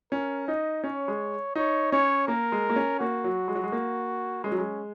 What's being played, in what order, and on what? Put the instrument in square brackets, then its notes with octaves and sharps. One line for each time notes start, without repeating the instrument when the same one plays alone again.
[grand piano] C#4 [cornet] A#4
[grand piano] D#4 [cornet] D#5
[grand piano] C#4 [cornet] C#5
[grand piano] G#3
[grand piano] D#4 [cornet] C#5
[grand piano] C#4 [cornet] C#5
[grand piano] A#3 [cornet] A#4
[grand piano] G#3
A#3
C#4
[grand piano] A#3 [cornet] F#4
[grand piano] F#3
G#3
F#3
G#3
A#3
[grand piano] G#3 [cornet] C#4
[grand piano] F#3
G#3